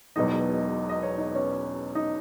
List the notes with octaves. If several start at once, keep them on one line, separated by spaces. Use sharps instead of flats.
E1 E2 B2 F#3 D#4 D#5
D#5
C#5
D#4 D#5
C#4 C#5
D#4 D#5